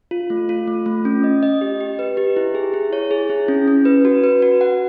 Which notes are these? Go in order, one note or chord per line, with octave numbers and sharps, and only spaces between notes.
F4
A3
F4
A3
A3
C#4
D#5
D#5
G4
G4
B4
G4
E4
G#4
E4
C#5
G#4
E4
C#4
C#4
B4
F#4
B4
F#4
F#5